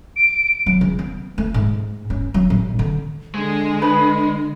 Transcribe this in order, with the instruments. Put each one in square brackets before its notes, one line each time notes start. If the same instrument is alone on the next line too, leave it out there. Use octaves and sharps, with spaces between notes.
[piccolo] D7
[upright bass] F#3
C#3
B3
A3
G#2
C#4
F#3
A1
D3
[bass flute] D3 [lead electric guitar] G#3
[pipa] B4